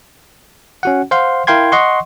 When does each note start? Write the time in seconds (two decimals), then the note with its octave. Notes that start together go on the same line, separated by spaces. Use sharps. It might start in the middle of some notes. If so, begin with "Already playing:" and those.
0.83 C#4 F#4 F#5
1.11 C5 F5 F#5 C6
1.47 E4 A#4 F5 G5 C6 G#6
1.72 D#5 F#5 C6 C#6